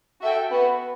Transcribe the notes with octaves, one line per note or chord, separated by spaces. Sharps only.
F#4 A4 E5 G5
B3 F#4 B4